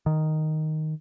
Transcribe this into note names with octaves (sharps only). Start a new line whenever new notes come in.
D#3